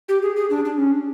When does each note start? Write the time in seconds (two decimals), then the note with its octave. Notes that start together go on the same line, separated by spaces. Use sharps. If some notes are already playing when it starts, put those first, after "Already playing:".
0.09 G4
0.23 G#4
0.36 G#4
0.50 D4
0.65 D4
0.78 C#4